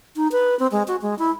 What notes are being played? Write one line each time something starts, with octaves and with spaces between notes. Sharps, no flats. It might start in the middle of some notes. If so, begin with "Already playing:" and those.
D#4
B4
C4
G#3
F#4
G#3
E4